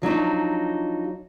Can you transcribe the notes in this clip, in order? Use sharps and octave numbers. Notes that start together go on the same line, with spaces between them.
F3 F#3 D4 D#4